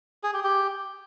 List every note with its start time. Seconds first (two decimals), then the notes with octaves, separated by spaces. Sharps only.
0.24 G#4
0.34 G4
0.44 G4